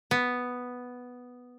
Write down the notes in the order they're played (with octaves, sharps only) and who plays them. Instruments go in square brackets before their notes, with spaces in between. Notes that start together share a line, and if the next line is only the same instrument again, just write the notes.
[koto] B3